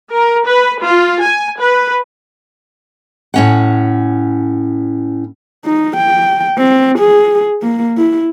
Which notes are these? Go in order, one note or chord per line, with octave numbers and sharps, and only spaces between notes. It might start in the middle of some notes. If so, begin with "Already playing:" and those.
A#4
B4
F4
G#5
B4
A2 C#4 F#5
D#4
G5
C4
G#4
A#3
E4